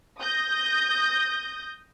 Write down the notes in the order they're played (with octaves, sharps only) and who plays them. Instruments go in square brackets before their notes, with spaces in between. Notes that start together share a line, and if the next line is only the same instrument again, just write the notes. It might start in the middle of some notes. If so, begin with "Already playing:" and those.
[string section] D#6 G6 A#6